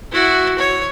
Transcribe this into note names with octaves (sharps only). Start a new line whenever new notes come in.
E4 F#4
C#5